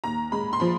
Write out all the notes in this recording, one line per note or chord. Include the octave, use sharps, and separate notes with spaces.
D#2 A#5
G#3 B5
C6
F3 B5